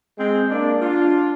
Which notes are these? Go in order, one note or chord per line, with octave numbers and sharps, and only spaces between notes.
G#3 C4
A#3 D4
D4 F4